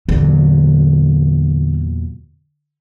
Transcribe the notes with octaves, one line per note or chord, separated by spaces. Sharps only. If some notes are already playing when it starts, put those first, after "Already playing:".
E2 A#2 D3 F#3